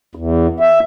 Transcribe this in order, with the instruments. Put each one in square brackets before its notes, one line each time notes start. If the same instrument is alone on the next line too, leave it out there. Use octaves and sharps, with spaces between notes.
[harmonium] E2
E5